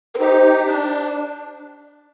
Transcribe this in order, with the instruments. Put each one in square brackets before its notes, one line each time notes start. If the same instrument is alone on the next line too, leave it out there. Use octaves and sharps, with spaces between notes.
[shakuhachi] A#4
[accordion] D#4 G4 [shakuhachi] C5
[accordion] D4